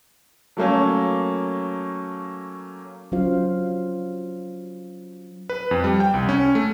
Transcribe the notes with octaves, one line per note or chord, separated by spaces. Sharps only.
F#3 A3 A#3 C#4
F#3 C#4 F4 C5 F5
B4
F2
G3
G5
C2
C#4
A3